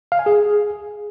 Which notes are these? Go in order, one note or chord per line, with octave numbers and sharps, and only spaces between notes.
F5
G#5
G#4